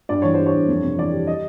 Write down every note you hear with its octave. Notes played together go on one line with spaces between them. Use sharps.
G2 D5
E3 C#5
C5
G3
C#5
G2
F2
C3
E3 D5
G3
D#5